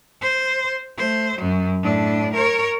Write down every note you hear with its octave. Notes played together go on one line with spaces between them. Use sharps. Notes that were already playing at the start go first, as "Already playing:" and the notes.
C5
A3 C5
F#2 F#3
A2 D4
A#4 C#5